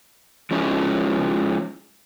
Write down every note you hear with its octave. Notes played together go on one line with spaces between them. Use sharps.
F3 G#3 C#4 D#4 E4